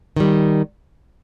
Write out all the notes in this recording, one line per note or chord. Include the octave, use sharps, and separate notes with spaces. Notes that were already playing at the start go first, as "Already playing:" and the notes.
D#3 G3